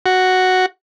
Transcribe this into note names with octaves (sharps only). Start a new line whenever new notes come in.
F#4